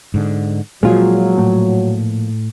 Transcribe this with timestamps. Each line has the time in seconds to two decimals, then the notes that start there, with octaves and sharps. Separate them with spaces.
0.14 G#2 D3
0.83 A#2 F3 F#3 G#3 F4 G#4
1.38 A2